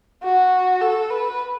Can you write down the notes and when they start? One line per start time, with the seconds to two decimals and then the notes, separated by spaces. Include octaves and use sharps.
0.23 F#4
0.81 A4
1.10 B4